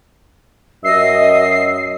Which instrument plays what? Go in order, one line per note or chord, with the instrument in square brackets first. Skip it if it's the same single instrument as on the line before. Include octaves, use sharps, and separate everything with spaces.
[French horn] F#2 [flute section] D#5 [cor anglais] E5 [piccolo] C7